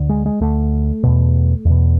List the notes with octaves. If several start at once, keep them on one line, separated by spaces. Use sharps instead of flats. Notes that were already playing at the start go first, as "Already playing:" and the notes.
Already playing: D2 D3
G#3
G#3
D2 D3 A3
E2 B2
E2 B2